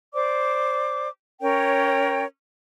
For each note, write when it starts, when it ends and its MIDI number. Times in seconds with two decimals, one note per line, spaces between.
0.14 1.07 72
0.14 1.07 74
0.14 1.07 86
1.41 2.24 61
1.41 2.24 70
1.41 2.24 73
1.41 2.24 79